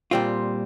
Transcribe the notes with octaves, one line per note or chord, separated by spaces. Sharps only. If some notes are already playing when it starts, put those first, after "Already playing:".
A#2 G3 C4 F4